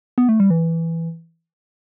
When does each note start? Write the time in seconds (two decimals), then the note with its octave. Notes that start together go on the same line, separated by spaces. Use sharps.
0.18 B3
0.29 A3
0.40 G3
0.50 E3